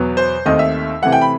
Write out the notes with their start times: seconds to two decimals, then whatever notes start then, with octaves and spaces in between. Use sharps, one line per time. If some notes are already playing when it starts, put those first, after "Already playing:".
Already playing: E2 B2 F#3 B3
0.17 C5
0.45 D#2 D#3 A3 C4 D#4 D#5
0.59 E5
1.02 C3 E3 A3 E4 F#5
1.12 G5
1.21 B5